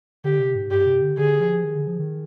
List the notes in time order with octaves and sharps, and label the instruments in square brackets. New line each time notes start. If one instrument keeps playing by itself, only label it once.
[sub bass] D3 [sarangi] G4
[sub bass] C3
G#2
[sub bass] G2 [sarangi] G4
[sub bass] C3
D3
[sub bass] D3 [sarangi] G#4
[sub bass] F3
D#3
D3
F3
D#3